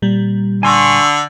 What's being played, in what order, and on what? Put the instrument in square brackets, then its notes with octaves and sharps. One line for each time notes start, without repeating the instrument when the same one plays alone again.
[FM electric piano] A#2 G3
[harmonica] D3 [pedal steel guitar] G#5 C6 C#6